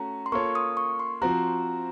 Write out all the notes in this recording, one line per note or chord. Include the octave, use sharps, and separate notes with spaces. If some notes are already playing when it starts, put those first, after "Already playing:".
Already playing: A3 C#4 F#4 A#5
C6
A#3 F4 A4 C#5 C#6
D#6
C#6
C6
F3 C4 F#4 A#5